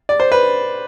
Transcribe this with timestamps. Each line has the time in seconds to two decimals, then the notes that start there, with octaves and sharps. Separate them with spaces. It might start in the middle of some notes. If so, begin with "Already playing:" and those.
0.09 D5
0.20 C5
0.32 B4